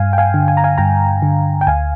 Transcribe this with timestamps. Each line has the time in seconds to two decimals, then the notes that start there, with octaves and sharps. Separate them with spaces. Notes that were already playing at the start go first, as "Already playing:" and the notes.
Already playing: G2 F5 G#5
0.13 G5
0.18 F5 G#5
0.34 D3
0.48 G#5
0.57 A#5
0.64 F5 G#5
0.78 G2 G5 A#5
1.22 D3
1.61 G5
1.67 D2 F5 G#5